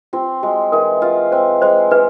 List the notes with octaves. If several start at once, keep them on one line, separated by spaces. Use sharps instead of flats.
C4 F4
G#3 F#4
E3 A#4
F4 B4
C4 C5
G#3 C5
E3 B4